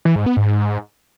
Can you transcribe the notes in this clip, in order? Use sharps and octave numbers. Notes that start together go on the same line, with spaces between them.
E3
G#2
B3
G#2